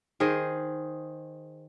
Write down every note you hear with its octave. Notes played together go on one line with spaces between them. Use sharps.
D#3 G#4 C5 D#5